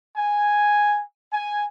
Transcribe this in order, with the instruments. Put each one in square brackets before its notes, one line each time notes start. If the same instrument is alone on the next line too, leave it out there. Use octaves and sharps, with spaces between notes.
[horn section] G#5
G#5